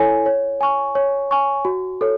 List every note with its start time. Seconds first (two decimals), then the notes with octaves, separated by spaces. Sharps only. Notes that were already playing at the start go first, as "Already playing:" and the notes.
Already playing: E4 A4 C#5 G#5
0.26 C#5
0.61 G#5 C#6
0.95 C#5
1.31 G#5 C#6
1.65 F#4
2.01 A4 C#5